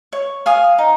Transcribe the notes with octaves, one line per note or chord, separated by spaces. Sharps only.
C#5
F5 G#5 D#6
D#4